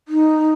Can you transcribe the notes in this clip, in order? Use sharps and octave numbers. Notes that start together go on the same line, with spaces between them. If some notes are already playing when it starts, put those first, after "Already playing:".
D#4